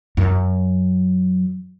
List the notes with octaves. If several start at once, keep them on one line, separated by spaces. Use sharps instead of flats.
F#2 F#3